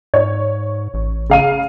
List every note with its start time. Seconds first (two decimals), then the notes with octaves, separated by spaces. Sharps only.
0.14 G#2 C#5
0.94 A1
1.30 C#3 F5 D#7